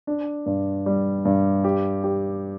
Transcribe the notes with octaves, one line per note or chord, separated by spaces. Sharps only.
D4
G2
G3
G2
G4
G4